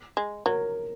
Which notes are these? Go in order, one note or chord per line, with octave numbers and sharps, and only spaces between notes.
G#3
F#3 A#4